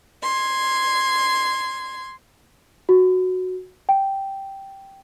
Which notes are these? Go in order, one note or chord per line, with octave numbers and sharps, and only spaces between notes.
C6 G#6
F#4
G5